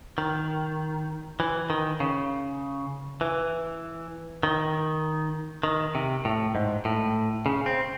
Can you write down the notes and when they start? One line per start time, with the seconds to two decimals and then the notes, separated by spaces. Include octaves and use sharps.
0.18 D#3
1.40 E3
1.70 D#3
2.00 C#3
3.21 E3
4.43 D#3
5.63 D#3
5.95 C3
6.25 A2
6.55 G#2
6.85 A2
7.46 C#3
7.66 C4